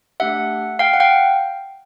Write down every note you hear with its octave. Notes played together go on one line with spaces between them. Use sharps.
A3 D4 G4 E5 F#5
F5 G5
F#5
F5 G5